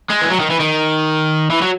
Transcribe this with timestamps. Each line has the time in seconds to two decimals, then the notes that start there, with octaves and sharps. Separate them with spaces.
0.10 G#3
0.21 E3
0.30 F#3
0.40 D#3
0.50 E3
0.60 D#3
1.51 E3
1.62 F#3